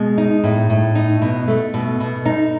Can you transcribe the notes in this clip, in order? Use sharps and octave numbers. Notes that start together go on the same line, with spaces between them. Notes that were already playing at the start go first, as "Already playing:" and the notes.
Already playing: B2 G#3
D#4
A2
A2
D#4
B2
A3
B2
B2
D#4